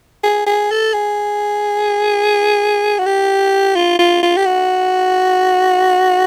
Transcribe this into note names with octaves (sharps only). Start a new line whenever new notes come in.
G#4
G#4
A4
G#4
F#4
G4
F4
F4
F4
G4
F#4